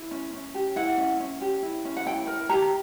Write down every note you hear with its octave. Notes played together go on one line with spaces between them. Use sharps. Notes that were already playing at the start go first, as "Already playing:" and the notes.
Already playing: E4
C#4
C#4
G4
E4 F#5
C#4
C#4
G4
E4
C#4
F#5
E4 G5
A#4
G4 A#5